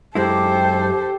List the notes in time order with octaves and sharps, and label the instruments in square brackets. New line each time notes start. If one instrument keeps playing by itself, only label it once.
[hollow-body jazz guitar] F#2 G#3 E4 [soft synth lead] G4 [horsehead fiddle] A4 C5